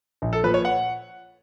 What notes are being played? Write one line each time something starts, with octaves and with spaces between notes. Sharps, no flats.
A#1
A4
A#2 F3 B4
C#5
F#5